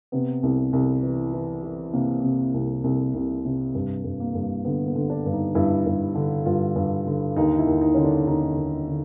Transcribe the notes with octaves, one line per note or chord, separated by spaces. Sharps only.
C3 B3
C2
C2
E3
E3
E3
C3 A#3
C3
C2
C2
C2
C3
G2
G2
A#3
G2
D3 B3
B3
D3
D4
G2
D#4
G2 E4
G2
D3
G2 F4
G2
D3
D#2 D#4
E4
D#2
D#4
D3 C#4
D4
D#2 D#4
D#2
D3